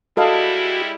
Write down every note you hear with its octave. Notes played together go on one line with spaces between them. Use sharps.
G3 G#3 E4 F#4 A4 D#5 F5